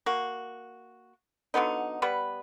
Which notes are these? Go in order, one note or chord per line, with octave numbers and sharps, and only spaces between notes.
A#3 F#4
D3 F#3 B3 D#4
G3 B3 B4